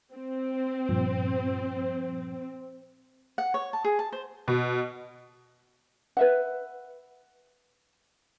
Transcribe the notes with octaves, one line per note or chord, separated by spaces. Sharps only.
C4
G2 A#2 F3
F#5
C#5
A5
G#4
A5
C5
B2
B4 E5 F#5